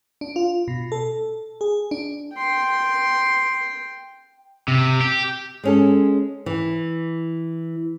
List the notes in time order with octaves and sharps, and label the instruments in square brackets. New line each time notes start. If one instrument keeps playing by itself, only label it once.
[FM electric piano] D4
F4
B2
A4
G#4
D4
[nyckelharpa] G5 C6
[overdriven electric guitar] C3
G4
[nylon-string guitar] G#3 C#4 A4
E3